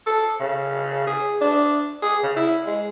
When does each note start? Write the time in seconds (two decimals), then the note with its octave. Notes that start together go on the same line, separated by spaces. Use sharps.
0.07 A4
0.40 C#3
1.07 G#4
1.41 D4
2.02 G#4
2.23 C#3
2.36 E4
2.66 G#3